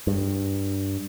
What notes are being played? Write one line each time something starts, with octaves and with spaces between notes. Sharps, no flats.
G2